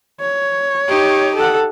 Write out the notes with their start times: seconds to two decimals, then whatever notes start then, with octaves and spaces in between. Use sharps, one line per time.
0.21 C#5
0.88 D#4 G4
1.36 A4 F#5